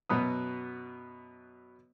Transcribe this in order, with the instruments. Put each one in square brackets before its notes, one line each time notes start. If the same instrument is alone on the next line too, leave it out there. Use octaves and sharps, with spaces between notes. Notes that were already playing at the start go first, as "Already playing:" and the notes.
[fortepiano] F#2 B2 F#3 B3 D#6